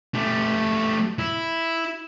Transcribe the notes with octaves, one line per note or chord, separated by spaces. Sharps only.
A3 G4
E4